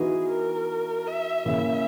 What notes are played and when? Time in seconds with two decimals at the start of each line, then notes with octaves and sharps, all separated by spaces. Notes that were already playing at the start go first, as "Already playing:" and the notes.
Already playing: E3 B3 D#4 F#4 G#4
0.28 A#4
1.07 E5
1.45 C#3 E3 A#3 E5